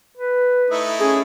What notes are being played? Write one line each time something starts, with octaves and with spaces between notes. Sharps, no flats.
B4
A3 D#4 E4
C#4 G#4